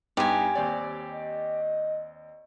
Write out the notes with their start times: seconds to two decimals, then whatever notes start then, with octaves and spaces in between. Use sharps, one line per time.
0.17 G2 B3 D#4 G4 G#5
0.55 D#2 C4 D5
1.13 D#5